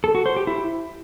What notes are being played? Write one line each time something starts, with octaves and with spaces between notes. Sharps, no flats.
A4
F#4
C5
G4
E4